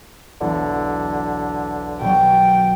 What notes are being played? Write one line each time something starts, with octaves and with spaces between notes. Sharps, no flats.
B1 E2 D3
B2 D#3 F#3 G5